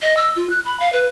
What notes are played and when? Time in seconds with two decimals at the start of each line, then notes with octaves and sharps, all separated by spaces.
0.02 D#5
0.17 E6
0.36 F4
0.50 F#6
0.65 B5
0.80 F5
0.93 B4